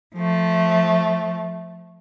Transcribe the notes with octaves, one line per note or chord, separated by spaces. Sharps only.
F3 A3